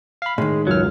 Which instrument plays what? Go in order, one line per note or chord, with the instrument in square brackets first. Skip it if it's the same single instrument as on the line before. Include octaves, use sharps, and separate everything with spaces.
[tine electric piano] F5 B5
[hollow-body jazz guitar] A2 D#3 [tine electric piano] G#3
[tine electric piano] C#2 F#2 F6 [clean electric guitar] F#3